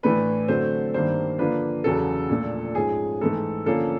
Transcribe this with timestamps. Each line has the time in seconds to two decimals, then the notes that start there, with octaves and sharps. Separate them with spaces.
0.03 A2 E3 A3 D4 B4
0.48 D3 F#3 A3 C4 C5
0.94 G2 D#3 G3 A#3 C5
1.39 D3 F3 A#3 D4 B4
1.84 E2 C#3 F#3 A4
2.29 A#2 F3 A3 D4
2.75 G#2 F3 G#3 C#4 G#4
3.21 G#2 E3 A3 A4
3.66 D3 F3 A#3 C#4 A4